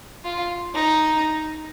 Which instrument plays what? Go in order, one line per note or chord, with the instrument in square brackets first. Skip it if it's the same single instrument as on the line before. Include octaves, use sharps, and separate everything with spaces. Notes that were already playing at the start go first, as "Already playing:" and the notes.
[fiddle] F4
D#4